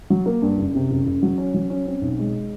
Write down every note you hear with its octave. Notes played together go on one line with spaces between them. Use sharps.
F#3
A#3
G2
F#1
C3
F#1
F#1
F#3
C#4
F#3
C#4
C4
B1
G#3